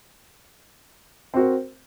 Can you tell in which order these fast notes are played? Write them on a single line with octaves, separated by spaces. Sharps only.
C4 F#4 A#4